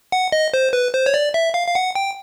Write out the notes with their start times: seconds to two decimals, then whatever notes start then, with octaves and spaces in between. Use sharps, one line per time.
0.12 F#5
0.32 D#5
0.54 C5
0.73 B4
0.93 C5
1.06 C#5
1.14 D5
1.34 E5
1.54 F5
1.68 F5
1.75 F#5
1.95 G5